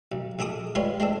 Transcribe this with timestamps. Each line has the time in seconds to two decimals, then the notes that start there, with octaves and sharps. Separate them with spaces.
0.12 B1
0.39 A#1 G#4 A4 D6 D#6
0.75 G3 G#3 F4 B4 C#5
1.00 G#3 C4 D4 A4